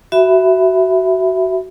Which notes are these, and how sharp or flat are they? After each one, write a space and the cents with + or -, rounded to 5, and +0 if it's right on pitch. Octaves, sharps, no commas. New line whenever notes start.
F#4 +20 E5 +0 B5 +10